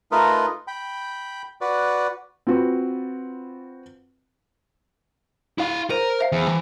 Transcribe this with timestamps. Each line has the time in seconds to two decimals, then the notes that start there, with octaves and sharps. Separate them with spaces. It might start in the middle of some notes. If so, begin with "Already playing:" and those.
0.12 A3 D#4 F4 A#4 B4 D#5
0.67 G5 B5
1.61 F#4 B4 D5
2.47 C4 F4 F#4 B4
5.58 E4 F5
5.90 A#4 C5 D#7
6.19 C5 E5 F5
6.32 E2
6.48 E3